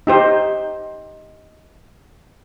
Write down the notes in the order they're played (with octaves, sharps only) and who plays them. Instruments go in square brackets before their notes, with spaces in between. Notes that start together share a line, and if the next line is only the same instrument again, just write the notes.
[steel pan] D#4 G4 C5